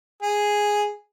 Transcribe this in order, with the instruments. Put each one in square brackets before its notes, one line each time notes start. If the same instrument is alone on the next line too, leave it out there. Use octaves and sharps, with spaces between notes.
[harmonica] G#4